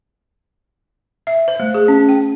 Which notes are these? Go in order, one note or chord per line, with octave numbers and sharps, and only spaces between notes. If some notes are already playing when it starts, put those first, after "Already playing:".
E5
C5
A3
G#4
C#4
G5